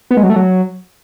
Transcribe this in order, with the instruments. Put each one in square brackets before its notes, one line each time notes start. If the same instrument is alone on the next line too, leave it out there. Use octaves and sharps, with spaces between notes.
[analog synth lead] B3
G#3
F#3
A3
F#3